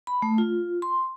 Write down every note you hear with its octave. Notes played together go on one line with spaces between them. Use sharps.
B5
A3
F4
C6